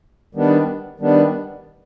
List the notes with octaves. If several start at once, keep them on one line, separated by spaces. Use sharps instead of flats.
D#3 G3 B3 D4
D#3 G3 B3 D4